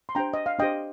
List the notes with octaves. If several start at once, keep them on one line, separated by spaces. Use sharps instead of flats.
C6
D4 G4 C5 G5 A#5
D#5
F5
D4 G4 C5 D#5 G5